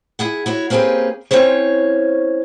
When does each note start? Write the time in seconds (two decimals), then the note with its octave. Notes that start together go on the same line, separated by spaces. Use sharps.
0.19 E4 G#4 F#5
0.46 E4 F#4 C#5
0.70 A#3 C4 C#4 G4 G#4 B4
1.31 C4 C#4 E4 C5 C#5